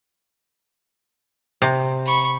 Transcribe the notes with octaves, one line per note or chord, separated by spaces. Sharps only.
C3
B5 C#6